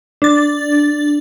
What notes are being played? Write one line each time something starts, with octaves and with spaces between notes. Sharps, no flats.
D4 A6